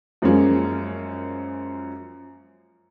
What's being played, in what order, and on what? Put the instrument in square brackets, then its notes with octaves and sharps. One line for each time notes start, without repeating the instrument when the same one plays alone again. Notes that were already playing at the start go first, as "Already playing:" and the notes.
[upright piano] F#2 F3 G#3 A#3 C#4